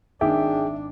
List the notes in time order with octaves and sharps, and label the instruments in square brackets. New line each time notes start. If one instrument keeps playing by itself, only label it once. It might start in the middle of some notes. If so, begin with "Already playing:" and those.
[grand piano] G#1 G#2 D6 [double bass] D4 [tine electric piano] G#4 G5 [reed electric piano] E5